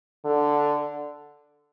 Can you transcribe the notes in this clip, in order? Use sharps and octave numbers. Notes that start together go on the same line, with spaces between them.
D3